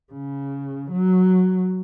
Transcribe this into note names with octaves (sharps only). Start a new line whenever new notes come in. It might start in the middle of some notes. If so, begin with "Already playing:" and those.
C#3
F#3